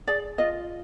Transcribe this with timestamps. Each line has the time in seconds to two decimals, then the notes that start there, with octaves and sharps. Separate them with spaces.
0.07 G#4 D5
0.38 F4 D#5